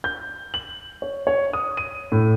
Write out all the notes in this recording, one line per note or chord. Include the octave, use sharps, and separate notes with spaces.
G6
F#7
C#5
C#5
D#6
D#7
A2